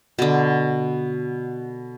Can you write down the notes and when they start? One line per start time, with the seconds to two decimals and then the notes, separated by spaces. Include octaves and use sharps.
0.19 B2 D3